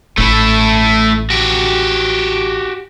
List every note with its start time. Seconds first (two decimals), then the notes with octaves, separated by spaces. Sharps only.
0.18 A1 A3 E4
1.30 F#4 G4